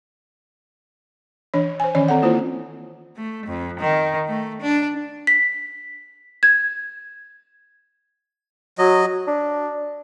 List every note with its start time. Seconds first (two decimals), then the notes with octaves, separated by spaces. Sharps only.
1.54 E3 D4 C#5
1.80 C5 G#5
1.95 D#3 E3 C#4 C#5 D5
2.08 C4 A4 F#5
2.22 A#3 E4 F4 C5
3.16 A3
3.46 F2
3.80 D#3
4.28 A3
4.62 D4
5.27 B6
6.43 G#6
8.78 F#3 F#4 D#5
9.28 D4